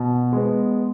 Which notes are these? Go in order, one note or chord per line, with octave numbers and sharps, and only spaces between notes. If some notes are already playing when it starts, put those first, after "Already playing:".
Already playing: B2
G#3 B3